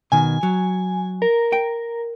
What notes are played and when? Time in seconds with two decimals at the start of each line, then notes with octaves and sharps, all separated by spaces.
0.12 B2 D#3 G#5
0.43 F#3
1.22 A#4
1.53 G5